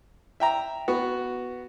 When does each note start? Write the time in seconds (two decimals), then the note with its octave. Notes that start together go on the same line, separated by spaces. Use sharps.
0.40 E5 G5 A#5
0.88 B3 F#4